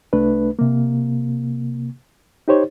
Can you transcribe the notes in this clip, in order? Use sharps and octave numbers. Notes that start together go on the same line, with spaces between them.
C2 A3 D4 B4
C3 A#3
D#4 G4 C5 C#5